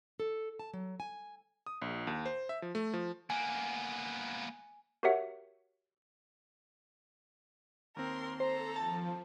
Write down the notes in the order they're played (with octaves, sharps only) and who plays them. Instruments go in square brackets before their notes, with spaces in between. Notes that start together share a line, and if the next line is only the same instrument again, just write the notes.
[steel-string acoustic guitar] A4
A5
F#3
G#5
[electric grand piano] D#6
A#1
D#2
C5
E5
F3
A3
F3
[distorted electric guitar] A#3 B3 [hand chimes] G#5
[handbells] F#4 G4 A#4 C#5 E5 F#5
[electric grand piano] D#2 C4 [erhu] A#4 [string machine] C6
[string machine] A4 [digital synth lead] C5 [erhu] A#5
[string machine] F3 [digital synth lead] A5